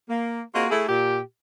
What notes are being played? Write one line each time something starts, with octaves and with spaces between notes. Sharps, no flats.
A#3
A#3 C4 F4 F#4 G#4 D#5
A3 E4 G#4
A#2 G4